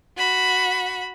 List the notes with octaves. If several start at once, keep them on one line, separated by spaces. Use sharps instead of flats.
F#4 B5